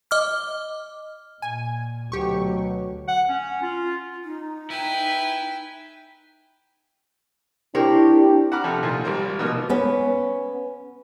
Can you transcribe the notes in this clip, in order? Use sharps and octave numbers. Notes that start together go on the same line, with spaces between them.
D#5 D6 F6
A#2 G#5
D2 B2 F#3 G4 C#6
F#5
C#4
F4
D#4
E4 B4 G5 G#5
C4 D4 E4 G4 A#4 C#5
F#5 A#5 B5 D6 F6
C3 F3 A4
A#2 D#3 F3
G#1 G3 A#4 C5
B2 D#3 F3 A#3
B3 C#4